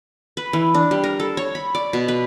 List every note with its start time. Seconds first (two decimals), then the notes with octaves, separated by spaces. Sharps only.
0.37 B4
0.53 E3
0.75 D4
0.91 G3
1.04 A#4
1.20 A4
1.37 C#5
1.55 B5
1.75 D5
1.93 B2
2.08 B4